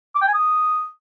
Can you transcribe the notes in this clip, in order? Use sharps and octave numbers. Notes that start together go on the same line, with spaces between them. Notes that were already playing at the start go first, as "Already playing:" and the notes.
D6
G5
G#5
D#6